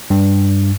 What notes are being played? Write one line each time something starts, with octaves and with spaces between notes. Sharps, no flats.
G2